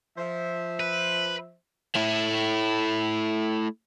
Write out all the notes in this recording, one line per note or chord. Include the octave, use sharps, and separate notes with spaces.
F3 C5 E5
B4
A3 E4